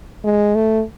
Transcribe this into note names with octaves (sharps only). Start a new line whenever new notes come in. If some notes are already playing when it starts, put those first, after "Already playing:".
G#3
A3